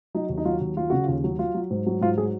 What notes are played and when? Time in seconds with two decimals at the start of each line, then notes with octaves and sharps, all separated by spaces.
0.14 F#3 D#4
0.29 D#2
0.38 D#4
0.45 F#3 F4
0.61 D#2
0.77 F#3 F4
0.90 C#3 F#4
1.03 D#2 F4
1.24 F#3
1.39 F#3 F4
1.54 F#3
1.70 G#2
1.86 F#3
2.01 G#2 F4
2.18 F#3 G#4